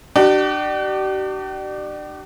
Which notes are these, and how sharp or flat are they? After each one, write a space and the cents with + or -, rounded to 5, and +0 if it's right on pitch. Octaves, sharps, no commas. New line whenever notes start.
D4 +30 G4 -40